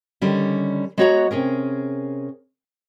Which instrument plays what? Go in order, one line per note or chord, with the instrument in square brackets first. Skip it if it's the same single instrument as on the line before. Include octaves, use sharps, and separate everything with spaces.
[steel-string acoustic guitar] D3 D#3 G3 C#4
G#3 B3 F#4 C#5 F#5 A#5
C3 C#4 G#4 A#4